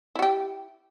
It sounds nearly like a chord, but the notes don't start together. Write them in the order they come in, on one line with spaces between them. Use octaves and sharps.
E4 F#4 G4